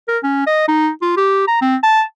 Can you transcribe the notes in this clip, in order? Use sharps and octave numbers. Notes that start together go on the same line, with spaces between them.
A#4
C#4
D#5
D#4
F4
G4
A#5
C4
A5